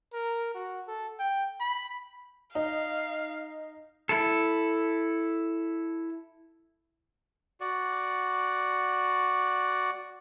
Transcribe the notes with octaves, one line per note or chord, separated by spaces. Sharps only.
A#4
F#4
A4
G5
B5
D#4 F5
E4 A4
F#4 D5